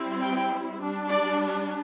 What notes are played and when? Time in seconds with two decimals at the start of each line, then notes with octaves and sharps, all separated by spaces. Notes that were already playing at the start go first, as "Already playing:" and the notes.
Already playing: G3 C4 E4
0.21 G5
0.79 G3 D4
1.10 D5